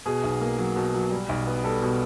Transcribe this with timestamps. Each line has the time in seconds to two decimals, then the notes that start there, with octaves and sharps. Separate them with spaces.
0.06 B2 G#4
0.24 B1
0.41 A#3
0.59 F#3
0.76 B2
0.94 F#3
1.12 G3
1.29 B1
1.47 B3
1.64 G3 A4
1.82 B2